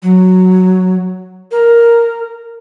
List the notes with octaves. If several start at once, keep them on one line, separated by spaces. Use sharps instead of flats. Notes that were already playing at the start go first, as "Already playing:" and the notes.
F#3
A#4